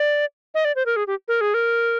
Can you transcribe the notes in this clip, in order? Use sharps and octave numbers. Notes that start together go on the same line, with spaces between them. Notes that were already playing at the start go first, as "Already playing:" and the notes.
Already playing: D5
D#5
D5
C5
A#4
G#4
G4
A#4
G#4
A#4